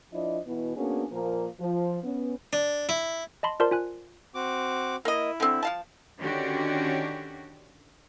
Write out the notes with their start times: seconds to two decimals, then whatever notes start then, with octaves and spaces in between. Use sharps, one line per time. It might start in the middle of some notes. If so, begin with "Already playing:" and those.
0.13 F3 D4 E4 D5 D#5
0.46 B2 E3
0.76 A#3 B3 C#4 D4 F#4 G#4
1.11 A#2 F3 A#3
1.59 F3
2.04 B3 C#4
2.53 D4
2.89 E4
3.43 D#5 A5 B5 C6
3.60 F4 A#4 C5 D5 A5 C6
3.71 F4 G#5 F#6
4.35 C4 F#4 D6
5.05 A#3 E4 D#5
5.40 D3 C4
5.63 F3 F5 A5
6.19 D3 D#3 C#4 D4 F#4 G4